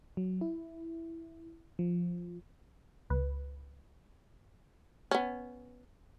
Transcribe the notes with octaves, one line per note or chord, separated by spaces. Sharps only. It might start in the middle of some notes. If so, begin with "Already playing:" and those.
F#3
E4
F3
C#2 B4
B3 C#4